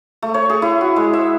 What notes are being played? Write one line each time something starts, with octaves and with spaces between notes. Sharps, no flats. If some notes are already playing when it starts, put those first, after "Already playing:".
A3
C#5
G#4
E4
F#4
G#3
E5